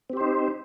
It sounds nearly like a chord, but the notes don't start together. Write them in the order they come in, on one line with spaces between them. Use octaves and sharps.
C4 G4 C5 D#4